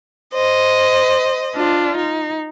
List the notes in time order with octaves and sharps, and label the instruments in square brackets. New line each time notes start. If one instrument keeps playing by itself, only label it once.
[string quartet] C5 D#5
D4 F4
D#4